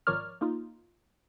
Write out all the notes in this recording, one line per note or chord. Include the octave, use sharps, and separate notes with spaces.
G#1 F3 A#4 C#5 D5 F6
A#3 D#4 F4